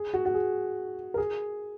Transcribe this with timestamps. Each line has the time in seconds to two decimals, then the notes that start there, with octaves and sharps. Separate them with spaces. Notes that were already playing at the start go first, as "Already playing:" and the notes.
Already playing: G#4
0.14 F#4
0.25 F#4
0.34 G#4
1.14 A#4
1.18 G#4